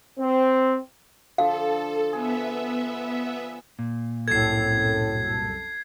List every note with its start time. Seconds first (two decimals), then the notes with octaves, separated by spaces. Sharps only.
0.19 C4
1.38 D3 F3 A4 F5
2.13 B3 G#4 E5
3.79 A#2
4.28 C2 F#2 A2 A4 G#6 C7